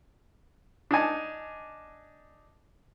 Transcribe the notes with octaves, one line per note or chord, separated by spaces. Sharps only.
D4 D#4 G#5 A5